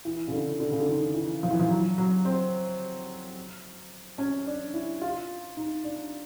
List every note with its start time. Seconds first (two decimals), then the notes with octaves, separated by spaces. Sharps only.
0.05 E3
0.28 C#3
0.31 D3
0.60 D3
0.72 C#3
0.80 D3
0.88 D#3
1.14 E3
1.43 F3
1.51 E3
1.59 F3
1.70 F#3
1.98 F#3
2.25 C4
4.18 C#4
4.46 D4
4.73 E4
5.02 F4
5.57 D#4
5.84 D4